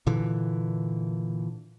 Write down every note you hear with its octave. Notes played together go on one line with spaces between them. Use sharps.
A#2 D3 E3